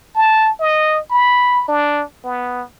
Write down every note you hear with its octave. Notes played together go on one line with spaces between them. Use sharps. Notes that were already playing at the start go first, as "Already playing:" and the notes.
A5
D#5
B5
D4
B3